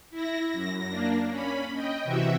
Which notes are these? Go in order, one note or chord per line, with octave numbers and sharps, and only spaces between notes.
E4 A#6
F#2 A#6
A#3 D4
C#4 B5
D#5 G5
C3 E3 F#4 E5